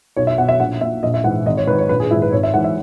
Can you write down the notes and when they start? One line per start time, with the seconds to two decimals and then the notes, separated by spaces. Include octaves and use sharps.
0.16 B1 C#5
0.27 E5
0.38 B2 F#5
0.49 E5
0.60 A#1 F#5
0.81 A#2 E5
1.03 A#1 D#5
1.14 E5
1.24 G#2 E3 F#5
1.46 G#1 D#5
1.57 C#5
1.67 G#2 D#3 B4
1.78 C#5
1.89 A#1 B4
2.00 G#4
2.11 G#2 D#3 E4
2.22 B4
2.32 G#1 C#5
2.43 E5
2.54 G#2 E3 F#5
2.64 E5